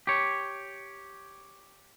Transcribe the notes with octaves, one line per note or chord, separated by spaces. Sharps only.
G4 C#5